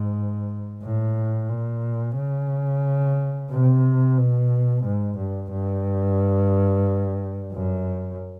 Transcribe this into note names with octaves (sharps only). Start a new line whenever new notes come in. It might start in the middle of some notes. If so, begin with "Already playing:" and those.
Already playing: G#2
A2
A#2
C#3
C3
B2
G#2
G2
G2
F#2